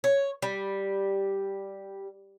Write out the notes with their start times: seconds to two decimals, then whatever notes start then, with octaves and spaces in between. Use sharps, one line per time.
0.04 C#5
0.42 G3